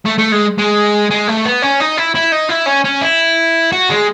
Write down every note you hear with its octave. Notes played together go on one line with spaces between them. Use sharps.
A3
A3
G#3
G#3
G#3
A3
B3
C#4
D#4
E4
E4
D#4
E4
C#4
C#4
E4
F#4
G#3